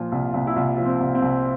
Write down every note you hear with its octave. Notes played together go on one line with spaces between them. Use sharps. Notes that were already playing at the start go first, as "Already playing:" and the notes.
Already playing: A#2 F3 F4
C2
C2
E4
C2 F4
F3
C4
C2
C4
C2